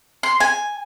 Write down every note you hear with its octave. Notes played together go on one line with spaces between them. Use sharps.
C6
G#5